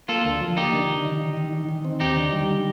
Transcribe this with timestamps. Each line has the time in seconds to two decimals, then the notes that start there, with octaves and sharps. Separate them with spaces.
0.08 A#3 F4 A4
0.25 D2
0.41 F3
0.57 A#3 D#4 G4
0.73 D3
0.89 D3
1.05 D#3
1.21 D#3
1.37 D#3
1.53 D#3
1.69 D#3
1.85 C4
2.00 D#2 D#4 G4
2.16 D3
2.33 G3